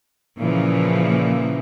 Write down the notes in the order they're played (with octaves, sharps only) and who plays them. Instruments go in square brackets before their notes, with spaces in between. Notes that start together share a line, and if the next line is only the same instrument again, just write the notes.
[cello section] A#2 C#3 E3 F3 A#3